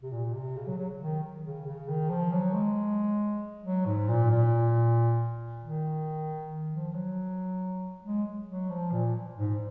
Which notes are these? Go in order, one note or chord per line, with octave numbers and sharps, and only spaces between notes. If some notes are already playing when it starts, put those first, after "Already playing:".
C3
A#2
C3
C#3
F#3
F#3
D#3
C#3
C#3
D#3
F3
F#3
G#3
F#3
G#2
A#2
A#2
D#3
F3
F#3
G#3
F#3
F3
A#2
G#2